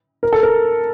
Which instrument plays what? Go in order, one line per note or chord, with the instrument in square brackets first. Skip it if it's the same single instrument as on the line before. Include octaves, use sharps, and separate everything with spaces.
[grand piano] A#4
A4
A#4